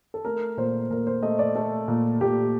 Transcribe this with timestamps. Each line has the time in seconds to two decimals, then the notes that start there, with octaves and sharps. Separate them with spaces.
0.14 A4
0.25 A3 A#4
0.57 A#2 C5
0.90 A#2 A#4
1.07 C5
1.23 A3 D#5
1.39 D5
1.55 A3 A4
1.88 A#2
2.21 A#2 G4